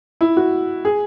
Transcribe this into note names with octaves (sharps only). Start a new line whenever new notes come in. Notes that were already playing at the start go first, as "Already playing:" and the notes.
E4
F#4
G#4